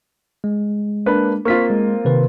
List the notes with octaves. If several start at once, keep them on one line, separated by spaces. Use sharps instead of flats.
G#3
A#3 D4 B4
A#3 C4 F4 C#6 F6 B6
G#3
C3 D#3 B4